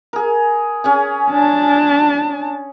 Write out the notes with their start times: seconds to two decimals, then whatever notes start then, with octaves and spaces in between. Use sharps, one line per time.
0.13 G#4 A#4
0.84 C#4 G#4 G#5
1.31 D4 A5